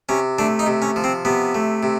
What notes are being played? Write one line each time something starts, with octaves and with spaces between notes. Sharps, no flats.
C3 C#4
A3 D4
D#4
C3
C#4
F3
C4
C3 B3
A3
C3